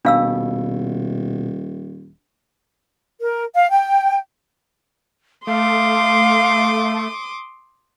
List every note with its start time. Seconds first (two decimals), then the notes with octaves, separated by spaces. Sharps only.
0.05 D#1 B2 D4 F5 E6
3.19 A#4
3.54 F5
3.70 G5
5.47 A3 F5 C6 D6 D#6